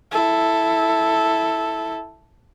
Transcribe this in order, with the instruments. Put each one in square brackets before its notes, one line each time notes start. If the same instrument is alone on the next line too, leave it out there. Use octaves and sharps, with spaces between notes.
[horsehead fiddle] E4 A4